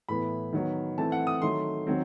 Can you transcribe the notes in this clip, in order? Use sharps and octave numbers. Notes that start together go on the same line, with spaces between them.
A2 E3 B3 B5
D#3 F#3 B3
E3 A3 C4 A5
F#5
D#6
D#3 F#3 A3 C6
D#3 F#3 C4